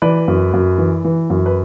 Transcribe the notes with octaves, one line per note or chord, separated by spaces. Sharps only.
E3 B4 D5
F#2
F#2
E3
E3
F#2
B4